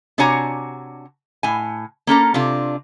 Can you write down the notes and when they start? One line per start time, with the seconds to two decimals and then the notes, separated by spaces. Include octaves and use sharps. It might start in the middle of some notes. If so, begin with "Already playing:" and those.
0.18 C3 D4 F#4 C#5 G#5 A#5
1.43 A2 G#5
2.07 A#3 C#4 A4 A#5
2.34 C3 D4 F4